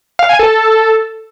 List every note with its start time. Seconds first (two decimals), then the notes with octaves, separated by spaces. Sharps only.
0.19 F5
0.29 G#5
0.39 A4